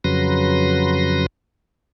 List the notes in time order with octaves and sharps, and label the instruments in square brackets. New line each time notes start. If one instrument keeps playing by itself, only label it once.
[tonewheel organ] F2 C#3 F#3 B4 C6 A#6